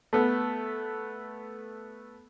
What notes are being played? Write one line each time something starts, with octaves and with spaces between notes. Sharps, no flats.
A3 B3